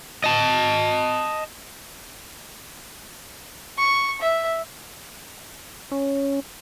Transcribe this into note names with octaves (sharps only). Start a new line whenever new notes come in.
D#5 A5
C#6
E5
C#4